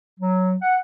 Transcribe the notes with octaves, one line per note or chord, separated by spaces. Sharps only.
F#3
F#5